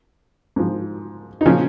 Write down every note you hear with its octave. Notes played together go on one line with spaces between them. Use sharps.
G#2 F3
D#4
A#2 C#3 F3 C#4